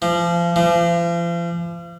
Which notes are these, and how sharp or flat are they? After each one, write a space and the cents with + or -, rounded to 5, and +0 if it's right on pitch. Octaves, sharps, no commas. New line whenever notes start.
F3 -30
F3 -40